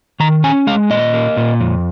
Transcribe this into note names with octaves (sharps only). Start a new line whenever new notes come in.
D#3 A#5
C#4 G#5
G#3 F5
A#2 D#5
A#3
A#2
F2